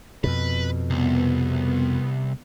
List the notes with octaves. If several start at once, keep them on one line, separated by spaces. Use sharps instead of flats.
F2 B2 B4
C2 B3